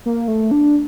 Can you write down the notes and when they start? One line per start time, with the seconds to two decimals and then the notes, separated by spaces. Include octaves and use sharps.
0.06 A#3
0.28 A3
0.51 D4